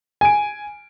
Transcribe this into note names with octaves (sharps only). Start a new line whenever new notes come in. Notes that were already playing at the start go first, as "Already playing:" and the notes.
G#5 D7